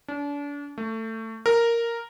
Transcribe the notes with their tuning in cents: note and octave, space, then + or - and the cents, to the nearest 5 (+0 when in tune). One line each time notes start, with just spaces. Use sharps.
D4 -35
A3 +20
A#4 -5